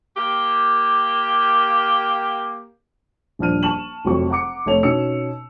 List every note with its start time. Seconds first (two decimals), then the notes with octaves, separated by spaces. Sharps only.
0.16 A#3 G4
3.39 D#1 F3 D4 F6 D#7
3.63 A5 C#6 E7 F#7
4.05 F1 F2 F#3 C#6
4.30 F#5 A#5 D6 C#7
4.66 F1 A3 C#5 F7
4.83 B2 C#4 D#4 E6 C#7